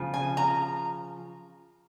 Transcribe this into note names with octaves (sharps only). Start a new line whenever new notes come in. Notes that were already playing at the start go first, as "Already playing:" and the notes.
Already playing: C#3 F3
G#5
A#5